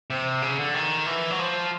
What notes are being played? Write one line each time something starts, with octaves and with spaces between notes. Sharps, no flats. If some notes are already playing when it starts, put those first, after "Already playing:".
C3
C#3
D3
D#3
E3
F#3
F3